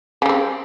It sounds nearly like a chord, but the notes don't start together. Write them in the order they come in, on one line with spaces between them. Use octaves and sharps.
C#3 G3 C4